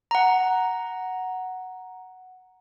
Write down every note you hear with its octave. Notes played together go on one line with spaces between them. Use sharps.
F#5 A#5